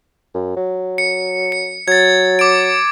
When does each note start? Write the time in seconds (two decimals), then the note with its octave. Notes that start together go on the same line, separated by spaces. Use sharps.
0.34 F#2
0.56 F#3
0.98 C#7
1.52 C#7
1.88 F#3 G#6 A6
2.39 D6 D7